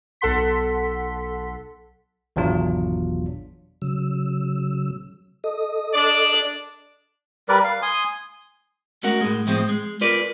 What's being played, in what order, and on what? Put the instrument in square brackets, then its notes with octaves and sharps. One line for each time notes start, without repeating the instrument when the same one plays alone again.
[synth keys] B1 A4 F#5 C6 B6
[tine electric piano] G#1 E2 B2 F#3 D4 F4
[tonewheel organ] C#3 F#3 E6
A4 D#5 D#6
[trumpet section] D4 D5
[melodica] G3 A#4 B4 D5
F5
G#5 C6 D#6
[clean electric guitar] G#3 A3 C#4 F#4 A#4 F#5
A2 G#3
A2 F3 G#3 C4
G#3
F4 A#4 B4 D5